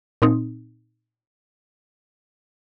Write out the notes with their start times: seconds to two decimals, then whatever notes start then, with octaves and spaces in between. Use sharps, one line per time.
0.22 A#2 C4 D#4